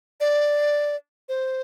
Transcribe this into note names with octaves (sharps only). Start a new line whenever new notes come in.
D5
C5